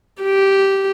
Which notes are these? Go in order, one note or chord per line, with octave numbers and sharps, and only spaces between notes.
G4